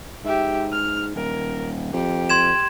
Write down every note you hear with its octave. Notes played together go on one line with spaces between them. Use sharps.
G#2 G4 E5
F6
D#1 A#4
F2 G4
C6 G#6 E7